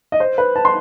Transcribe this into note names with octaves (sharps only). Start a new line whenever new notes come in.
D#5
C5
B4
A5
C6